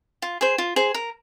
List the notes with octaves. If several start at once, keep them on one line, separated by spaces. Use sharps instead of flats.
F4
G#4 C5
F4
G#4 C5
A#4